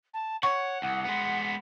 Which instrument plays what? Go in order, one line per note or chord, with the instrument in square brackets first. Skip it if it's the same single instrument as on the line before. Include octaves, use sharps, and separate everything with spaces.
[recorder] A5
[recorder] C#5 [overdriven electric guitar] F#5 [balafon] C#6
[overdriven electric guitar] C2 [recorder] F#5
[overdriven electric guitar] G#3 B3